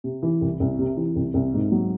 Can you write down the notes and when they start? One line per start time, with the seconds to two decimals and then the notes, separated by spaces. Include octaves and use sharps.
0.04 C3
0.23 E3
0.41 C2
0.60 C2
0.79 C3
0.97 E3
1.16 C2
1.34 C2
1.54 G#2
1.72 F#3